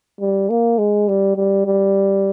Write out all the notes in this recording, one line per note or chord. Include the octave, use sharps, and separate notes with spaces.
G3
A#3
G#3
G3
G3
G3